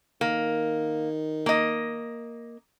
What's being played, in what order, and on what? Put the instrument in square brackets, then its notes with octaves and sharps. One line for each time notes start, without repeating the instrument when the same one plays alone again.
[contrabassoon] D#3 [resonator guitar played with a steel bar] A#3
[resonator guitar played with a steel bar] A#3 D#5